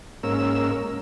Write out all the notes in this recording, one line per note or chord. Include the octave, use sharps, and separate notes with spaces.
G#2 A#3 C#4 A#4 E6